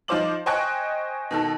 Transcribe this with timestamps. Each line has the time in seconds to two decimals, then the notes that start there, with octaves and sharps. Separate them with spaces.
0.08 F3 D#4 F4 C5 D6 F#7
0.46 C5 D#5 G5 G#5 C#6 F#6
1.31 B2 D#3 A4